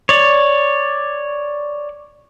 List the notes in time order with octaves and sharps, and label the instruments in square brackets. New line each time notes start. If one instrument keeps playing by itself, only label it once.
[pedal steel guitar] C#5 D5